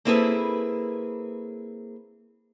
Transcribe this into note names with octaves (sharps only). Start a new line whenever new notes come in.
A#3 C4 E4 G#4 A4 B4